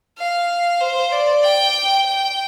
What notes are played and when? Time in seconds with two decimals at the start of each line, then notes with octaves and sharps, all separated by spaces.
0.18 F5
0.80 C5
1.12 D5
1.43 G5
2.06 G5